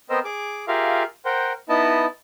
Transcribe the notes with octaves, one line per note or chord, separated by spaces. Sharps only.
B3 C4 A#4 C5 D#5 E6
G#4 D6
F4 G4 G#4 A#4 E5 F5
A#4 C5 F#5 G5
B3 D#4 E4 D#5 A5